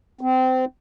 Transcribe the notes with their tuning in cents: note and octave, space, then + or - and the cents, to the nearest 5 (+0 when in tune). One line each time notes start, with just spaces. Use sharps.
C4 -25